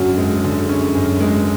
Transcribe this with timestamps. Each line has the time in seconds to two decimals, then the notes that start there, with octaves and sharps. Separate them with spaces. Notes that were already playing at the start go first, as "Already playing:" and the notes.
Already playing: F#2 D3 C#4 F#4
0.18 G#3
0.44 D3
0.69 C#4
0.94 F#2
1.20 G#3